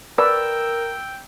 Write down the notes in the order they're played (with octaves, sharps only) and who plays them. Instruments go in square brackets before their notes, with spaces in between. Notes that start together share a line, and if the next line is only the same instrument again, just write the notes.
[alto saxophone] A#4 [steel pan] B4 D5 [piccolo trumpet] G5 [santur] E6